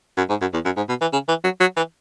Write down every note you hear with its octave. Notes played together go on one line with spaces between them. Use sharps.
F#2
G#2
F#2
E2
F#2
G#2
B2
E3
C#3
E3
F#3
F#3
E3